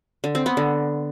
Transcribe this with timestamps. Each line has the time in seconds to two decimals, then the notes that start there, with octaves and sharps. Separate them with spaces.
0.24 D3
0.35 C4
0.46 B3
0.57 D3